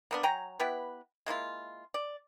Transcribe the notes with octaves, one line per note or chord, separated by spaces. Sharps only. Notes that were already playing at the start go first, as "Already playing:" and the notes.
A#3 B3 D4
F#3 G5 G#5 A#5
B3 E4 G4 B4
G#3 A#3 E4 F4
D5